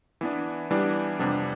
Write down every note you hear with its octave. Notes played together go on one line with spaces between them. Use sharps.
E3 B3 D4
E3 G3 B3 D4
F2 C3 G3 B3 D4